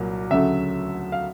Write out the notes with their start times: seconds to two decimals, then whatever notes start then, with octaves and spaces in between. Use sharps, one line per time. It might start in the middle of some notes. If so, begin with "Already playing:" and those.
Already playing: C2 A#2 F#3 A#3
0.31 D2 C#3 F#3 A3 E5
1.12 F5